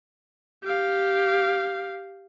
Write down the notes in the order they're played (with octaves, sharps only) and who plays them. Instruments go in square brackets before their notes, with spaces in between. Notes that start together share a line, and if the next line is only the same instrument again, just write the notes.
[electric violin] G4 F5